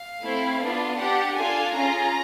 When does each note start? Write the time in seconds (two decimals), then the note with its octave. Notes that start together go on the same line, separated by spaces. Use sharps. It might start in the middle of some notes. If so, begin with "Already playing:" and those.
Already playing: F5
0.22 A3 C4 E4
0.60 B3 D4 F4
0.97 D4 G4 F#5
1.35 D4 F4 A4 G#5
1.73 C#4 F4 G#4 A#5